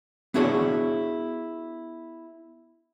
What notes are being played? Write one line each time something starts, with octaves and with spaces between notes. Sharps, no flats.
B3 D4 E4 F#4 G#4 C#5